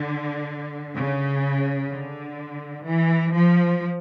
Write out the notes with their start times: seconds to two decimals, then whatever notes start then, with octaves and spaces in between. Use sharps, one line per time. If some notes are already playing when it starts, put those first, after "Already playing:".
Already playing: D3
0.96 C#3
1.90 D3
2.85 E3
3.33 F3